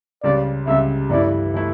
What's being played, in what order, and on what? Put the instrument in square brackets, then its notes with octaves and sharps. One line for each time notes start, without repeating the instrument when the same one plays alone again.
[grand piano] C#2 C#3 G3 [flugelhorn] D5
[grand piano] C#2 C#3 G3 [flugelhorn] E5
[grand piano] G2 E3 A3 E4 [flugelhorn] D5
[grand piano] E3 A3 E4